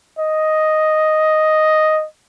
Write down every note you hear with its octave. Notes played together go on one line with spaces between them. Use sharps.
D#5